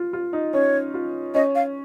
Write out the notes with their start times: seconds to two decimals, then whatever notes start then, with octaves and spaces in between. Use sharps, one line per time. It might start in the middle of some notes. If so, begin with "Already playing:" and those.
Already playing: F4
0.13 F4
0.33 D#4
0.54 C#4 C#5
0.94 F4
1.34 C#4 D#5
1.55 F5